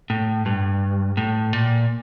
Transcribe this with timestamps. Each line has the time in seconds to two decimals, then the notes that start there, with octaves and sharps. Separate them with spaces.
0.10 A2
0.46 G2
1.17 A2
1.53 A#2